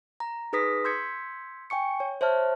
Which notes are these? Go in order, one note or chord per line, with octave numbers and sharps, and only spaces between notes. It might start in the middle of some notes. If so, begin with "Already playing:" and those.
A#5
D#4 G#4 B4 D#6 A#6 B6
C6 E6 G6 G#6 B6 C#7
G5 G#5 C#6 C#7
C#5
C5 C#5 E5 A5 F6